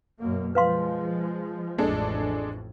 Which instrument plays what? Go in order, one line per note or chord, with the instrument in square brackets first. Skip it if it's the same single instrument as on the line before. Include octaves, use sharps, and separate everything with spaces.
[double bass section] F#2 B2 A#3
[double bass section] F3 G#3 [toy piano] B4 F5 C6
[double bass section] A1 F2 [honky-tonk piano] G#3 D4 A4